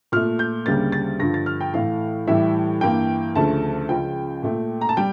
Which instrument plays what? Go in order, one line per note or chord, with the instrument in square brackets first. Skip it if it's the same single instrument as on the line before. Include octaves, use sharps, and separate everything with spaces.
[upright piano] A#2 A3 F6
G6
D2 C#3 G3 A#3 A6
A6
G2 D3 F3 A#6
A6
F6
G5
A2 E3 A3 F5
A2 E3 G3 E5
G2 E3 A#3 G5
D2 C#3 F3 A3 A5
C#2 C#3 F3 G5
A#2 A3
A#5
A5
G3 G5